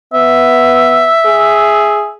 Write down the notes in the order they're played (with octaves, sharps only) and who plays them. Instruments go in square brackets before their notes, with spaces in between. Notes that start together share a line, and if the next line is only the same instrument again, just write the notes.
[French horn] B3 [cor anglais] E5
[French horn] G#4